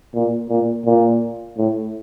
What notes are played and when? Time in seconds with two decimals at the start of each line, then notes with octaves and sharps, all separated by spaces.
0.14 A#2
0.49 A#2
0.85 A#2
1.57 A2